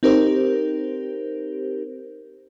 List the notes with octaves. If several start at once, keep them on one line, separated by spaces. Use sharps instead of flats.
C4 D#4 G4 A#4 C5